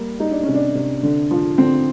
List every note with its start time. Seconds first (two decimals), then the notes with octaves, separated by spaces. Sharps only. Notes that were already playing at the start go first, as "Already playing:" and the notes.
Already playing: G3 A#3
0.20 G3 D#4
0.31 D4
0.43 C#4
0.48 C3
0.54 D4
0.75 C3
1.03 D3
1.31 F3
1.58 D3 C4